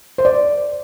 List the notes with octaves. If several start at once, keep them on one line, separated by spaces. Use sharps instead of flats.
C5
D5